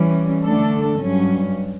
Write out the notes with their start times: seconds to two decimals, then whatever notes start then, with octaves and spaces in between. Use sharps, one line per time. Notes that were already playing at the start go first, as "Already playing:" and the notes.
Already playing: E3 G3 C#4
0.43 D3 A3 D4 A4
1.01 G2 F#3 C#4